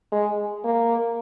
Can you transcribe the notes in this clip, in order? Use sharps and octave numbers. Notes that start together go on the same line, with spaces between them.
G#3
A#3